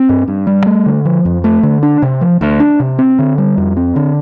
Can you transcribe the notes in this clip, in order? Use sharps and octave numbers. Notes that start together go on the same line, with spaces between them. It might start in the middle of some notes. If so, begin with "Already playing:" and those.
Already playing: C4
G2
G2
G3
A3
D3
F3
F2
A3
D3
D4
C3
F3
D2
D4
C3
C4
D3
G3
F2
C4
D3